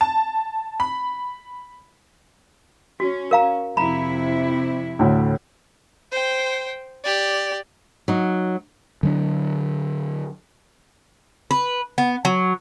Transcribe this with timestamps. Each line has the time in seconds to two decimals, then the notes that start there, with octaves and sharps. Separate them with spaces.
0.01 A5
0.80 B5
3.00 C#4 F#4
3.31 A#4 F5 A#5
3.77 F2 C3 E4 A#5 B5
4.99 D2 A2
6.12 C5 G5
7.04 G4 D5
8.08 F#3 D#4
9.03 D3 F#3 A3 D4
11.51 B4
11.98 B3
12.25 F#3